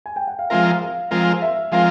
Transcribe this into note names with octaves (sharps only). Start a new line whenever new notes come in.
G#5
G5
F#5
F5
F3 G#3 C4 F4 A#4 E5
F5
F3 G#3 C4 F4 A#4 F5
E5
F3 G#3 C4 F4 A#4 F5